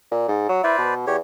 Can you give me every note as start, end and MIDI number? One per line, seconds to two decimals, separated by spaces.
0.11 0.27 46
0.28 0.46 44
0.49 0.63 54
0.64 0.77 64
0.64 0.94 71
0.64 0.94 72
0.64 0.94 74
0.78 1.02 47
1.07 1.19 40
1.07 1.16 67
1.07 1.16 73